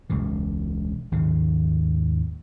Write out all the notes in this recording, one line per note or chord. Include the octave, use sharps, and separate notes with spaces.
E1 C#2 C#3 E3
G#1 D#2 C#3